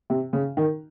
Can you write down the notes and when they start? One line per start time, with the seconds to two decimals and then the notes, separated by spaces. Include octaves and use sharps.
0.10 C3
0.33 C#3
0.57 D#3